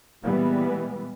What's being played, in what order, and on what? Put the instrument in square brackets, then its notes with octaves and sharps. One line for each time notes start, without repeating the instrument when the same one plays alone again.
[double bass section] A#2 E3 G3 G#3 B3